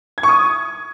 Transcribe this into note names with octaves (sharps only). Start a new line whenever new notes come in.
G#6
C#6
D#6